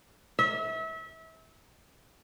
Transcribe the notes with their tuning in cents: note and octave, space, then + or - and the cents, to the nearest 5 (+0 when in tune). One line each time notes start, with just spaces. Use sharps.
E5 -30